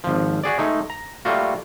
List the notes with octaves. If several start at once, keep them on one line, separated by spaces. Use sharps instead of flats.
G#1 F3
F#4 G#4 D5
G#3 A3 D#4
A#5
G3 A3 A#3 F4 F#4